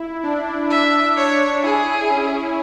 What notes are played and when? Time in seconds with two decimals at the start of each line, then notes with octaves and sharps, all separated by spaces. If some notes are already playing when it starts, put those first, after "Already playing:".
Already playing: E4
0.23 D4
0.70 D4 E5
1.17 D4 C#5
1.63 E4 G#4
2.10 C#4